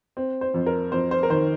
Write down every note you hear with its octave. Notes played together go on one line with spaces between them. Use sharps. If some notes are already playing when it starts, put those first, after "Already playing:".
C4
C5
F2
A#4
F2 C5
C5
A#4
D#3 C5